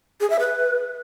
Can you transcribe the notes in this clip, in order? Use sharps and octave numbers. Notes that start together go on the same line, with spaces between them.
G#4
E5
B4